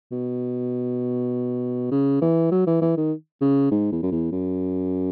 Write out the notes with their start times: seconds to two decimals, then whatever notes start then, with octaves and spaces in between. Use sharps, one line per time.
0.11 B2
1.91 C#3
2.21 E3
2.51 F#3
2.67 E3
2.81 E3
2.97 D#3
3.41 C#3
3.71 G#2
3.92 E2
4.02 F#2
4.11 E2
4.32 F#2